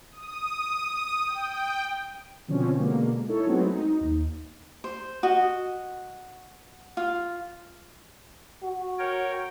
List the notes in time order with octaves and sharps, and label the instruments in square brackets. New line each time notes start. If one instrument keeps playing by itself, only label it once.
[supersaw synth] D#6
D#6
G5
[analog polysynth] B2 D3 F3 C4 C#4
B2 D3 G#3 A#3
D#4 E4 A4 C#5
F#3 G#3 A3 B3 C4
D#4
D#2
[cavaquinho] C5
F#4 D#5
F4
[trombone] F#4
[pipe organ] A#4 C#5 G5